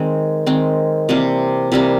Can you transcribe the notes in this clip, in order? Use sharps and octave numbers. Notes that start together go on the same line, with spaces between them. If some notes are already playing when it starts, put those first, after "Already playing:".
Already playing: D#3 G#3 C4
D#3 G#3 C4
C3 E3 G3 A#3
C3 E3 G3 A#3